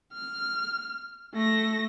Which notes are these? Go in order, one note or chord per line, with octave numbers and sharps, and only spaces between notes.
F6
A3 A#6